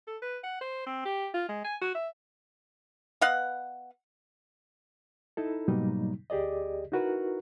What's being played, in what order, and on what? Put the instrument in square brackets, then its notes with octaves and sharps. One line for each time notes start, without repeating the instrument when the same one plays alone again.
[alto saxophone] A4
B4
F#5
C5
C4
G4
F4
G#3
G#5
F#4
E5
[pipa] B3 D#5 F5 F#5
[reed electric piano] D#4 E4 A4
G#2 B2 F#3 G3 A#3 D#4
D2 G4 G#4 D5 D#5
D#4 E4 F#4 A#4 B4